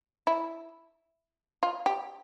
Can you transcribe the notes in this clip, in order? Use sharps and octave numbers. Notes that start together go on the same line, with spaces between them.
E4
F4
G4